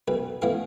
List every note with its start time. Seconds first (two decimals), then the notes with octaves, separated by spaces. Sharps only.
0.08 B1 B4
0.42 A2 E3 B3 F5